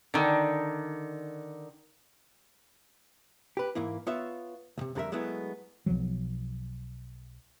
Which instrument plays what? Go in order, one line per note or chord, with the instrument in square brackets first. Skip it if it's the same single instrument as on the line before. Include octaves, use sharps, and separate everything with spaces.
[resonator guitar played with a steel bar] D3 D#3
[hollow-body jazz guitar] G4 B4
G#2 E3 A#3 E4
B3 F4 C#5 E5
C#2 C3
F2 D3 G3 A4 A#4 E5
F#3 G#3 A3 B3 E4
[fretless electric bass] B1 F3 F#3